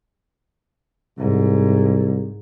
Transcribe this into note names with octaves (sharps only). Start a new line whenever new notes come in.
C2 G#2